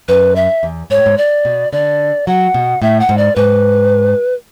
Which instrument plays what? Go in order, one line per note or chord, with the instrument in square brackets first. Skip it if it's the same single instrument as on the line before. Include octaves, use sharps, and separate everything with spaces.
[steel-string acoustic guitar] F#2 [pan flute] B4
[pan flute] E5
[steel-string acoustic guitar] E2
[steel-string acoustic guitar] G#2 [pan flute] C#5
[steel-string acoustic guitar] A2
G#2
[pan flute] D5
[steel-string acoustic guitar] B2
[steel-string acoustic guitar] D3 [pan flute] D5
[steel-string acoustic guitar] F#3 [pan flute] F#5
[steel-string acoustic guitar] B2
[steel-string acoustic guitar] A2 [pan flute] E5
[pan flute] F#5
[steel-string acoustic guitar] G#2
[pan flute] D5
[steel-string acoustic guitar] G#2 [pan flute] B4